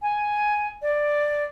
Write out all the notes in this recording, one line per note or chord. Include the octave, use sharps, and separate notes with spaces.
G#5
D5